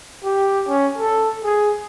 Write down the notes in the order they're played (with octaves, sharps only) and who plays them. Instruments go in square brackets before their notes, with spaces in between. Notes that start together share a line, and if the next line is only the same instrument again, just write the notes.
[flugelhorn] G4
C#4
A4
G#4